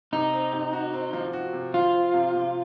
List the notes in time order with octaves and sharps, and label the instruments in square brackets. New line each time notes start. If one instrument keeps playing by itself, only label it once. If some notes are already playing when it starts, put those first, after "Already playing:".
[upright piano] C3 [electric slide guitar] D#4
[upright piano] C4
C3
F#4
C4
F3
F#4
C3
[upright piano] F3 [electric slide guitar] F4
[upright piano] C4
C3
C3